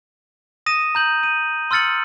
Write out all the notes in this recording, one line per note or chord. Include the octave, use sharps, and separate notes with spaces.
D#6 A#6 D#7 E7
A#5 G6 F#7
D#7
C6 E6 F6 A6 C#7 F#7